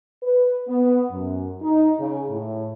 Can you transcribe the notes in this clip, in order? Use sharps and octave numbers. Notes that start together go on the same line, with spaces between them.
B4
B3
F#2
D#4
C#3
A2